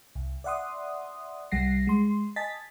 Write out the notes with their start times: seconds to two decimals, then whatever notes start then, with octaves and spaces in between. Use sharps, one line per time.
0.15 C2
0.44 D5 E5 F#5 C6 D#6
1.51 C2 G3 F#5 A#6 C7
1.87 G#3 C6
2.36 D#5 G#5 A5 A6 B6